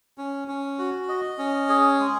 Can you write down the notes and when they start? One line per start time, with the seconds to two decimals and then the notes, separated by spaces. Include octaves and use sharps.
0.18 C#4
0.48 C#4
0.79 F#4
1.09 D#5
1.38 C#4
1.69 G#4
2.00 G#3